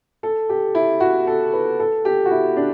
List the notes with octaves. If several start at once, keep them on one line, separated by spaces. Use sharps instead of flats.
A4
G4
E4
F#4
A4
B4
A4
G4
F#4
E4
D4